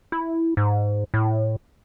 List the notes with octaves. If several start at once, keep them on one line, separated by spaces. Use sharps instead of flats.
E4
G#2
A2